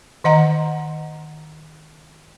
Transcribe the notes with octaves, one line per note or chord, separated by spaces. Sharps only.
D#3 D#5 F#5 A#5